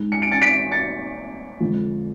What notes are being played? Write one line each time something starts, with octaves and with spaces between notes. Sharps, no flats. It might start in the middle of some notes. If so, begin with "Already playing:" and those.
Already playing: G#2 G#3
C#7
D7
A6 C#7
B6 D7
A6 C#7
F2 D3 G#3